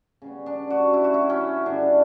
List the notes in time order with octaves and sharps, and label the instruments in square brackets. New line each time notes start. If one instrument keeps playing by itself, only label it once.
[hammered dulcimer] C#3 G3 B3
D4
F#4
E4
F#4
E4
C#4
G2 D3 G3 D4